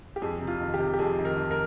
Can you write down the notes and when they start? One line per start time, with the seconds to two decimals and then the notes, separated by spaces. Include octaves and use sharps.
0.16 G4
0.22 F2 G#4
0.41 C3
0.47 F4
0.61 D#3
0.74 G4
0.79 C3
0.94 G4
0.99 F2 G#4
1.19 D#3
1.25 A#4
1.37 D#3
1.51 A#4